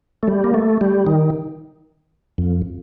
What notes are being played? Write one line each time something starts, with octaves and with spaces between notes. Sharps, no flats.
A3
G3
A#3
A3
G3
D#3
F2